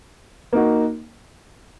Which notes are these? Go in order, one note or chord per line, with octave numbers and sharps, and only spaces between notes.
A#3 D#4 F#4